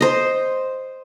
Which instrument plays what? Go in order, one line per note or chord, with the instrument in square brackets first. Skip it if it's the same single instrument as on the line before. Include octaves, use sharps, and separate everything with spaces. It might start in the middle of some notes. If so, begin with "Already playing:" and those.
[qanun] C5 D#5